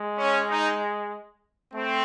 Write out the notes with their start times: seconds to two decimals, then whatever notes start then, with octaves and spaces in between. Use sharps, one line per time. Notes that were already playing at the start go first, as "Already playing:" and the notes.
Already playing: G#3
0.18 C#4
0.48 D#4
1.74 A3 C4